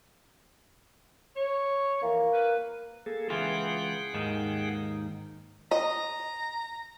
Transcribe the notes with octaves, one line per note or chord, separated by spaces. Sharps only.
C#5
F2 E3 A#3
A#4 B4
A#3 G#4 A4
C#2 E3 F4 G#4 F#5 G5
D#2 G#2 D#3
D#5 A#5